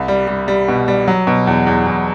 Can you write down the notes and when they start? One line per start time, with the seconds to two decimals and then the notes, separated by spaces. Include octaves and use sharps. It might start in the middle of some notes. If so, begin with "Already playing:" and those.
Already playing: C2
0.08 G3
0.28 G3
0.48 G3
0.68 B2
0.88 G3
1.08 F#3
1.27 B2
1.47 E2
1.67 E2
1.87 E2